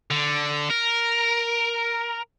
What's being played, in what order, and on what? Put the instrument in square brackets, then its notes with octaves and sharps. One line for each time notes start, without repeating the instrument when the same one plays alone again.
[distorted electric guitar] D3
A#4